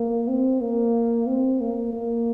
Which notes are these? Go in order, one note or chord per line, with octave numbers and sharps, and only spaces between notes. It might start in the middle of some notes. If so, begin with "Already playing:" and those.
Already playing: A#3
C4
A#3
C4
A#3
A#3